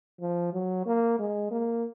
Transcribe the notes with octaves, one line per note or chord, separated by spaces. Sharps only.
F3
F#3
A#3
G#3
A#3